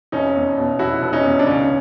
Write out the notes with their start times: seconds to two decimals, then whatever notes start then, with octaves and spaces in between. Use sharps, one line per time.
0.12 F1 C#4 D#4
0.35 E2
0.57 B2
0.79 F1 E4 F#4
1.02 F1
1.13 C#4 D#4
1.24 E2
1.39 D4
1.47 C#2 C#4